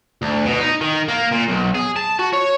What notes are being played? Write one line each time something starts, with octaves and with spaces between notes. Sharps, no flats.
D2
B2
D#4
D#3
A#3
A#2
B1
G#4
A5
F#4
C#5